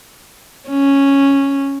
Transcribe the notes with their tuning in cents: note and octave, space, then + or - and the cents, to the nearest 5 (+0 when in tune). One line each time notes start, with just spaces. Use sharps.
C#4 -5